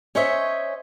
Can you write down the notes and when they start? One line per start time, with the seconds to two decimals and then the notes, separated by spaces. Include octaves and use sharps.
0.15 C#4 C5 C#5 D#5 E5